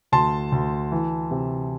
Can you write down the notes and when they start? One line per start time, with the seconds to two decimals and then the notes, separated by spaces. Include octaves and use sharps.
0.12 D2 A5 C6
0.52 D2
0.92 E3
1.31 C3